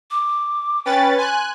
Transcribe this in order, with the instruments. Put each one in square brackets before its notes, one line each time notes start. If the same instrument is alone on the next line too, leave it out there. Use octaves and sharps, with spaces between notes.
[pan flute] D6
[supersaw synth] C#4 B4 A6 [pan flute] G5
[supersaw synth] G#5 F#6 [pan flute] C6